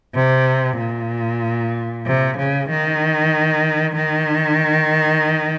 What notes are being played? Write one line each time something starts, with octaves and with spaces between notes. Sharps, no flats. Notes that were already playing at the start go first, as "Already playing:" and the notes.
C3
A#2
C3
C#3
D#3
D#3